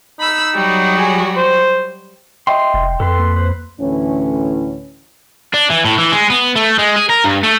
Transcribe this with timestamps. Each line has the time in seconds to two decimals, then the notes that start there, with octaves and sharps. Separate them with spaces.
0.20 D#4 B5 E6
0.55 F#3 G3 F#4
0.98 G#4
1.36 C5
2.47 D#5 E5 G5 C6
2.60 G5
2.74 F1
3.00 F2 A4 B4 C6
3.19 A#3
3.36 B4 C5
3.81 D2 A2 E3 C#4
5.54 D4
5.70 E3
5.85 A2
5.98 E3
6.12 G#3
6.30 B3
6.56 A3
6.79 G#3
6.96 G#4
7.09 A#4
7.24 G2
7.43 A3